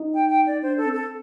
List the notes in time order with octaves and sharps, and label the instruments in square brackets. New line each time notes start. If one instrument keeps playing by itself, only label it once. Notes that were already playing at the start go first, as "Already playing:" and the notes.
Already playing: [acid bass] D#4
[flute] G5
G5
D5
[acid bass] D4 [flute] C5
[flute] A4
[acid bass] C4
[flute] A4